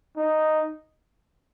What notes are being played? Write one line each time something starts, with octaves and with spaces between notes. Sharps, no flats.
D#4